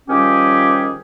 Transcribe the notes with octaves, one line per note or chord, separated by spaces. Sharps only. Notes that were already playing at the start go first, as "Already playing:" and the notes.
D#3 F3 G3 C#4 G4 G#4